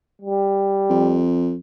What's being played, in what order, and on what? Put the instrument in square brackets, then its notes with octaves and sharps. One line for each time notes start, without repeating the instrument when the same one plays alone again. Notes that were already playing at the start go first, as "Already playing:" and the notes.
[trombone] G3
[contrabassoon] F2